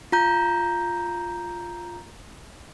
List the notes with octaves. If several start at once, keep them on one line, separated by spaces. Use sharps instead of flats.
F4 A#5 G6